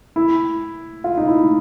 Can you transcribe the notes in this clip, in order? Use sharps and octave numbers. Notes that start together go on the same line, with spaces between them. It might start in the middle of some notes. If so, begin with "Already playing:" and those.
E4
F4
D#4
E4